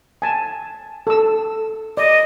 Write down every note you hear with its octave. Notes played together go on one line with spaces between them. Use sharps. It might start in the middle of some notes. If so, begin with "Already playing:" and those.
G#5 A5
A4 E6
D5 D#5